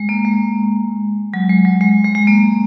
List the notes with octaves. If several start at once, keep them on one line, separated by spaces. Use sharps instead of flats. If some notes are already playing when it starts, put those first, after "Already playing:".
Already playing: G#3
A#3
G#3
F#3
G#3
F#3
G#3
G#3
G#3
A#3